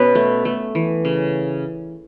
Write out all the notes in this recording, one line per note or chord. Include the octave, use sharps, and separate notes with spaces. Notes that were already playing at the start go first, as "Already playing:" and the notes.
Already playing: B2 B3 C#4 B4 C#5
A3
A3
E3
C#3